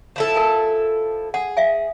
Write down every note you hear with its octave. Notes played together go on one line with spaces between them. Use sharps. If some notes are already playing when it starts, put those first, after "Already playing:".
F3 E4 A4
A#4 G#5
G#4 F#5
E5 F5 G#5